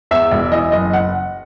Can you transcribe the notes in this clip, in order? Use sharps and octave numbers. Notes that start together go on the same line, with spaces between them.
E2 E5
E1
E3 D#5
F#1 D#5
F#5